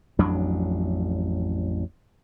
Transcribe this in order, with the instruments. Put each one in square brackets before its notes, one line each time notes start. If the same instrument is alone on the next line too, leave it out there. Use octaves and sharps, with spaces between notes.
[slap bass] A1 F2 F#3 D4